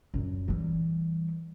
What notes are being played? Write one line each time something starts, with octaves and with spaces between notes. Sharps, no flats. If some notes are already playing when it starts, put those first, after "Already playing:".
F#2 A#2
E3 G3